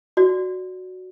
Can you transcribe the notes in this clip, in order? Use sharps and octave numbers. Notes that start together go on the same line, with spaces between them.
F#4 D5